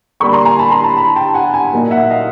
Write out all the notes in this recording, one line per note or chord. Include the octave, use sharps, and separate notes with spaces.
D3 G3 A#3 D4 B5 C#6
A#5 C6
G#5 A#5
A5 B5
A#5 C6
A5 B5
A5 B5
G5 A5
F#5 G#5
F#5 G#5
A#2 F#3 A#3 D#4
E5 F#5
D#5 F5